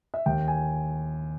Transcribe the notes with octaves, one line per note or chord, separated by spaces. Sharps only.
E5
D#2 G5
G#5